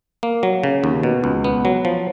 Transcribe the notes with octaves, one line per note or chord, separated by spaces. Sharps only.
A#3
F#3
C#3
D#2
B2
C#2
B3
F#3
F3